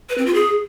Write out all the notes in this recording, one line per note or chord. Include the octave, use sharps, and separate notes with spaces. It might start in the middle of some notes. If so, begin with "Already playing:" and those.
B4
C4
F4
G#4